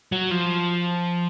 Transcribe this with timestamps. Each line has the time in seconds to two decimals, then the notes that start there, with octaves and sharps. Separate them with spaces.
0.12 F#3
0.31 F3